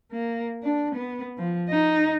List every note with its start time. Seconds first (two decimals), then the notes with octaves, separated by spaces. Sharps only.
0.12 A#3
0.63 D4
0.95 B3
1.38 F3
1.69 D#4